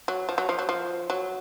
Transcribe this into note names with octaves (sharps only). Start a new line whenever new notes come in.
F#3
F3
F#3
F3
F#3
F3
F#3